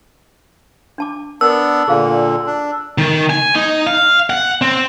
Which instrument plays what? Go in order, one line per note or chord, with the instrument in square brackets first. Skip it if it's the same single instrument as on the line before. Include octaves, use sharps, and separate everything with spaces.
[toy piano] D4 A5 D6
[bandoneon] B3 D4 [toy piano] A#4 [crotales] E6
[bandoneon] A#2 D3 [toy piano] G#4 F5
[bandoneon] D4
[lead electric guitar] D#3
G#5
D#4
F5
F#5
C4